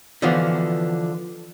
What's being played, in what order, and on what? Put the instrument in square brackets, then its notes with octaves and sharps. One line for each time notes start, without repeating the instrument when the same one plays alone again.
[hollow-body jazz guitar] D3 E3 F3 B3 F4 F#4